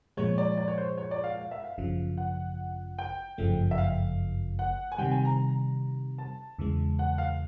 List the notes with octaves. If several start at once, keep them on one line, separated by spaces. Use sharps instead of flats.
A#2 F3 G#3 C#5
D5
D5
C#5
C5
C#5
D5
F5
F5
E5
F5
G#1 F#2 C#3 F3
F#5
G5
G1 F#2 C#3 F3 A3
E5
F5
F#5
G#5
C3 D#3 G3 G5
G#5
A#5
A5
E2 C#3 E3 G#3
F#5
F5